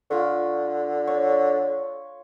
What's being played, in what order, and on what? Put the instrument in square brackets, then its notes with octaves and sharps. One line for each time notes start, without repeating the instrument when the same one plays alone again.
[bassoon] D3 [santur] F4 C#6
[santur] C#5